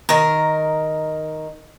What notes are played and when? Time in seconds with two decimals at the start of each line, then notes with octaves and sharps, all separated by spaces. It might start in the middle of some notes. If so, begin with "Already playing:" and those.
0.09 D#3 A#4